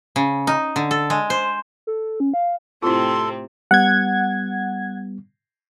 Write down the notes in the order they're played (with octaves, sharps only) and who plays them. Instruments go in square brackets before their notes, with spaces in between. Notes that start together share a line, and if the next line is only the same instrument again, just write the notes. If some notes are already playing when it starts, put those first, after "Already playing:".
[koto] C#3
D#4
D3
A4
G#3
C5
[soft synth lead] A4
C#4
F5
[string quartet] A2 C3 C4 [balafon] E4 F4 [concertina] A4 [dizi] C6
[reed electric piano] G3 B3 [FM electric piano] F#5 G#6